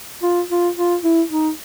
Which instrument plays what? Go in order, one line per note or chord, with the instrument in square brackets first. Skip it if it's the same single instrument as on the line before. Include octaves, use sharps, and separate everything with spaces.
[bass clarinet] F4
F4
F4
E4
D#4